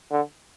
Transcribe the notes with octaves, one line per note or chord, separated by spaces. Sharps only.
D3